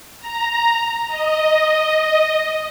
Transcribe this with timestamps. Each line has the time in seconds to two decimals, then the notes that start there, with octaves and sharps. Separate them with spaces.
0.20 A#5
1.08 D#5